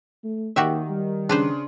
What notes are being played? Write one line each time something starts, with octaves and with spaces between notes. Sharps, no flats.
A3
D#2 D#3 F#4 G4 E5
G3
C#3 D4 B4 C5 C6